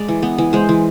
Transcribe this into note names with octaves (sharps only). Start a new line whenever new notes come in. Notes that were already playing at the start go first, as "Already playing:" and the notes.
Already playing: G#3 D5
E3
B3
E3
G#3 C5
E3